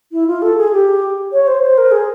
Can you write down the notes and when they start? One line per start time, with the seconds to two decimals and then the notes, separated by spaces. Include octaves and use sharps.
0.12 E4
0.27 F4
0.42 A4
0.57 G#4
0.73 G4
1.33 C#5
1.47 C5
1.63 C5
1.78 A#4
1.92 G#4